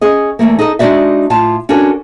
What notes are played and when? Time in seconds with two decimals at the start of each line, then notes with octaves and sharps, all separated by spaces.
0.01 C#4 G#4 D#5
0.39 E2 D#3 A3 A#3
0.59 D#4 G#4 A4 D#5
0.79 G#3 D4 D#4 F#4 D5 E5
1.30 A2 F4 A5
1.69 C#4 D4 F#4 A4 A#4 C#5